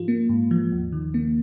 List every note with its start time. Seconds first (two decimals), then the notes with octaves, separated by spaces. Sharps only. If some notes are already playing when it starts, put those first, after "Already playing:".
Already playing: G#2 F3 F4
0.08 A#3
0.29 G#2
0.51 F3
0.72 D#2
0.92 D#3
1.14 A#3